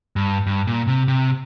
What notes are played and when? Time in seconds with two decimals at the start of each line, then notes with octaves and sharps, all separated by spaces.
0.16 G2
0.47 G2
0.67 A#2
0.88 C3
1.08 C3